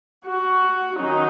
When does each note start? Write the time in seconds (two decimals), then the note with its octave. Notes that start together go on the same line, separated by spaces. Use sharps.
0.26 F#4
0.99 D#3 F#3 C#4 D#4